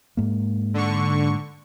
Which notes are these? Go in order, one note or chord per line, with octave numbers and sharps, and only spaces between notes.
G#2 A#3
D3 C#6